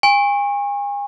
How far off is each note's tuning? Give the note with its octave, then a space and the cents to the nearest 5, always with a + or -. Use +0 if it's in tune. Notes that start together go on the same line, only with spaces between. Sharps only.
G#5 -40 C#6 -30